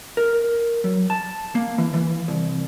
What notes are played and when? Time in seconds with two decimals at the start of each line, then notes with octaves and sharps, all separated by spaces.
0.17 A#4
0.84 F#3
1.10 A5
1.55 A#3
1.78 E3
1.94 E3
2.28 C2